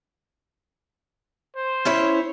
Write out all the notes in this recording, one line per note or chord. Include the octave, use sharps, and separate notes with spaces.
C5
C#4 E4 C#5